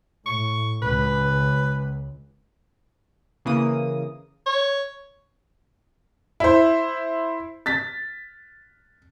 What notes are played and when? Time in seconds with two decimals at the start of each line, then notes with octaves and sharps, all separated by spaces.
0.26 A2 C#6
0.82 C#2 B4
3.45 C#3 E3 A#3 D#6
4.46 C#5
6.40 E4 C5
7.66 A6 B6